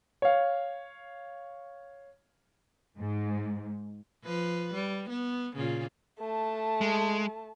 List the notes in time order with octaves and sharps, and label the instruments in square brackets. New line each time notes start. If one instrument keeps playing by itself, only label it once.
[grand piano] C#5 F5
[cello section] G#2
[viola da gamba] F3 B4
G3
B3
A#2 C#3 F4
[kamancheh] A3 A5
[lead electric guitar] G#3